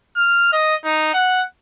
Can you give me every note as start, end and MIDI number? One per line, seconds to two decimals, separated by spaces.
0.16 0.51 89
0.52 0.75 75
0.84 1.09 63
1.14 1.43 78